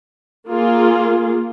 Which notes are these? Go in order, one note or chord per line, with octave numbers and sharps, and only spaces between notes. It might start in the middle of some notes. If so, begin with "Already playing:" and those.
A#3 F4 G#4